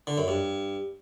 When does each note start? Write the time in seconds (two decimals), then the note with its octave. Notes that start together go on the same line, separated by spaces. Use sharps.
0.07 D3
0.18 F#2
0.28 G2